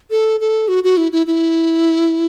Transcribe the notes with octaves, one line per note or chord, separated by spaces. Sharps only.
A4
A4
F#4
F#4
E4
E4
E4